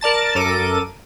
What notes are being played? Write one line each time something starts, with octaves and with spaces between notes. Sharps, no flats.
A#4 D5 A5 A6
F#2 A4 A#4 D6 D#7